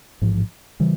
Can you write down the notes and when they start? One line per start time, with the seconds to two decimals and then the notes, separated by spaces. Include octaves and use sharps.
0.22 A1 G#2 F3
0.80 C#3 E3 G3